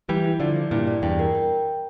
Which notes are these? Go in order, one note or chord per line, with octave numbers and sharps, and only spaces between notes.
E3 G3 E4
E4
D3 F3 D5
E4
G2 A#2 E4
D5
E2 G2 G5
A#4
G5